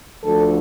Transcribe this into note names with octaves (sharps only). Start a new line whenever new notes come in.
D2 D3 F3 A4